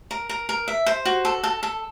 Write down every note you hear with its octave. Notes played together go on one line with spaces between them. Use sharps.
A#4
A#4
A#4
E5
C5
F#4
A4
A4
A4